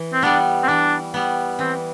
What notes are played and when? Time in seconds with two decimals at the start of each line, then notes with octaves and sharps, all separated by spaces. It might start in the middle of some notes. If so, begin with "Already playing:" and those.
Already playing: E3
0.13 C4
0.22 G3 B3 D4
0.63 C4
0.68 E3 D4
1.14 G3 B3
1.59 E3 C4